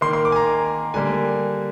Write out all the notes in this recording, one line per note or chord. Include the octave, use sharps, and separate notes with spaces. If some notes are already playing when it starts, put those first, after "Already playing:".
D#3 A#3 C6
C6
D6
G#5
A#5
D3 G3 A#3 G#5